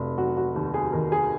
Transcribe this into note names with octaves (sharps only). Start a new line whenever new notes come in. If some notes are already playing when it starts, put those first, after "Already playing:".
Already playing: F1 F#3
F#3 F#4
F#4
D#2
G#4
D#3 A#4
G#4